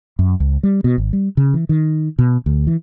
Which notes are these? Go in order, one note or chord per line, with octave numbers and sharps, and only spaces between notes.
F#2
C#2
G3
B2
G#1
G3
C#3
E3
D#3
B2
D2
E3